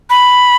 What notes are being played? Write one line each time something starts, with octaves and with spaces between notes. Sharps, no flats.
B5